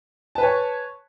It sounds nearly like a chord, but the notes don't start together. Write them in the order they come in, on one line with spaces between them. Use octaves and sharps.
A5 B4 G#5 C#5